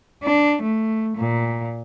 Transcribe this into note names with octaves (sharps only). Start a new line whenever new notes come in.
D4
A3
A#2